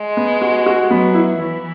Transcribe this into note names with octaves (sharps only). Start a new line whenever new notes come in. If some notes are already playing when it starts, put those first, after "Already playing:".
Already playing: G#3
B3
F#4
F#4
F#3 B3
E4
E3 E4